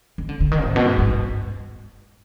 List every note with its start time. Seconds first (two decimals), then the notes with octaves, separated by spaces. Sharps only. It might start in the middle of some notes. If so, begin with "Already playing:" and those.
0.18 D#3
0.29 D3
0.40 D3
0.52 D#3
0.64 G#2
0.76 B2
0.86 G#2
0.98 G#2
1.10 G2